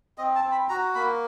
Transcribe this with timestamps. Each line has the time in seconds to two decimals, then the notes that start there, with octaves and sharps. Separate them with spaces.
0.18 C4 D#5
0.36 A5
0.44 C4
0.52 B5
0.69 F#4 A#5
0.95 A#3 B5